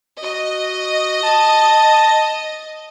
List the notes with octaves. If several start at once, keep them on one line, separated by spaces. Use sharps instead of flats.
F#4 D#5
A5